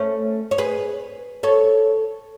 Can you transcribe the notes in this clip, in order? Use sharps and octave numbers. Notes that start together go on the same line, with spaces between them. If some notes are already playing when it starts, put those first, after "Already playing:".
Already playing: A3 C#4
C#5
G#4 B4
A4 C#5